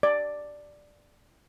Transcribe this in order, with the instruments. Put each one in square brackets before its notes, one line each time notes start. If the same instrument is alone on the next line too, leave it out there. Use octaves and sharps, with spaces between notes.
[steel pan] D5